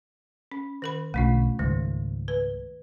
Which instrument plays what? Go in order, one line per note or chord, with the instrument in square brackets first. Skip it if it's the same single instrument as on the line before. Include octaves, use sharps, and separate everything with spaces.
[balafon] C#4
D#3 A#4 B5
[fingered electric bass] B1 D3 [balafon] A3 C#4 F4
[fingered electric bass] C#2 G#2 [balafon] D#3 G3
[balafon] B4